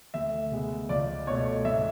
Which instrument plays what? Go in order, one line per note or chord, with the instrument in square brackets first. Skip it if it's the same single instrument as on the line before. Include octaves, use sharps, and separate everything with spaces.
[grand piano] D2 E5
C#3 G#3 B3
C#2 D5
B2 A3 C#5
G#2 E5